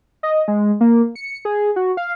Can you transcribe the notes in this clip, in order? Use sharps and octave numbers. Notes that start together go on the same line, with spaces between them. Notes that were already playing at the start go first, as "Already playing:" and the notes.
D#5
G#3
A#3
C#7
G#4
F#4
F5